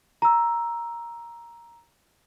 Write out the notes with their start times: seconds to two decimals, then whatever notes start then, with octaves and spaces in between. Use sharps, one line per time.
0.22 A#5 E6